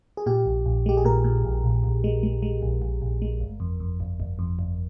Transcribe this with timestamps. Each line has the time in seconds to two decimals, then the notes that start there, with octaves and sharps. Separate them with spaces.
0.17 G#4
0.26 A#2 G4
0.46 A#1
0.66 A#1
0.86 G#3 G4
0.97 G#4
1.05 A#2 A#4
1.24 A#2
1.45 A#1
1.64 A#1
1.84 A#1
2.04 G#3
2.23 G#3
2.42 G#3
2.62 A#1
2.82 A#1
3.02 A#1
3.22 G#3
3.40 G1
3.60 F2
3.80 F2
4.00 G1
4.20 G1
4.39 F2
4.59 G1